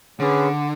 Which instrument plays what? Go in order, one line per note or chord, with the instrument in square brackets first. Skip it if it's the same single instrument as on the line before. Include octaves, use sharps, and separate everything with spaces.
[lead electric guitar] D3 [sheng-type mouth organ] C#4 G#4 B4